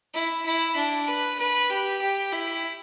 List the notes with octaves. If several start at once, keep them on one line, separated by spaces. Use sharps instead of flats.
E4
E4
D4
B4
B4
G4
G4
E4